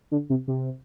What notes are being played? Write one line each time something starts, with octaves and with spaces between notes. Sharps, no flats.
D3
C3
C3